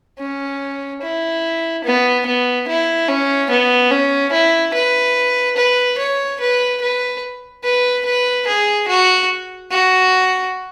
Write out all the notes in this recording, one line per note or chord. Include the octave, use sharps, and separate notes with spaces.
C#4
E4
B3
B3
E4
C#4
B3
C#4
E4
B4
B4
C#5
B4
B4
B4
B4
G#4
F#4
F#4